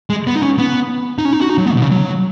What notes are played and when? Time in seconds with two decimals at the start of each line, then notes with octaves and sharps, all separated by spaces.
0.10 G#3
0.27 B3
0.35 D#4
0.43 C#4
0.59 B3
1.18 D#4
1.25 C#4
1.33 D#4
1.41 F#4
1.49 D#4
1.58 F#3
1.67 B3
1.74 B2
1.82 C#3
1.91 F#3